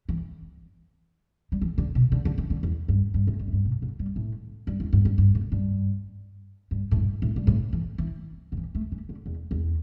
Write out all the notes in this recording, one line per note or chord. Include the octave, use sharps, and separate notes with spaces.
E3
G3
E3
D3
B2
D3
D3
E3
D3
E2
G2
G2
A2
G2
A2
G2
B2
D3
G3
A2
G2
E2
G2
G2
G2
A2
G2
G2
A2
G2
A2
G2
A2
E3
E3
D3
E3
A3
E3
D3
E2
E2